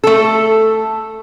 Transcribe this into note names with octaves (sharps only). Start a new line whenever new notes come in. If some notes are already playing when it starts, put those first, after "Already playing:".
A3 A4